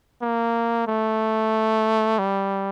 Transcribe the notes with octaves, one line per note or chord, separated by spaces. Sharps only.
A#3
A3
G3